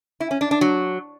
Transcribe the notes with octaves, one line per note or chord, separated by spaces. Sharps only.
E4
C#4
D4
D4
F#3